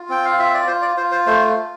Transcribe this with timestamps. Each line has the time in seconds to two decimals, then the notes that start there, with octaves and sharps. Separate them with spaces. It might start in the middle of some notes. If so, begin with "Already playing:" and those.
Already playing: F4
0.09 C4 G5
0.25 F5
0.39 F4 E5
0.54 D5
0.67 F4 C5
0.82 D5
0.97 F4 C5
1.11 C5
1.26 A3 C5
1.56 F4